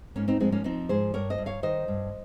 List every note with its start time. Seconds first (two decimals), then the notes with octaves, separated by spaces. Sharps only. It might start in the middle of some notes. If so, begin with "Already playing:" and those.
0.16 G#2 A#3 C#4
0.28 C4 D#4
0.40 F3 G#3 C4
0.52 A#3 C#4
0.64 F3 C4 D#4
0.89 G#2 G#4 C5
1.14 G2 A#4 C#5
1.30 C5 D#5
1.38 G2
1.46 C#5 F5
1.63 D#3 C5 D#5
1.88 G2